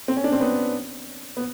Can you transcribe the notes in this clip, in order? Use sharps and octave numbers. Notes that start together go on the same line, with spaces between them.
C4
C#4
D4
C4
B3
B3